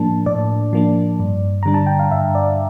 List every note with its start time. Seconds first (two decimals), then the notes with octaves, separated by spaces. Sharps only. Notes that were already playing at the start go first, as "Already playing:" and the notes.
Already playing: A2 F3 A#3 D4 A5
0.26 A2 D5
0.73 F3 A#3 D4
1.20 G2
1.63 D3 G3 D4 A#5
1.74 A5
1.87 G5
1.99 F5
2.11 G2 E5
2.35 D5